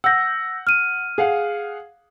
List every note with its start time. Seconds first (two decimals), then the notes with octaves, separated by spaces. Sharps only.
0.04 F#5 E6 G6 A#6
0.67 F6 D#7
1.18 G#4 F5 F#5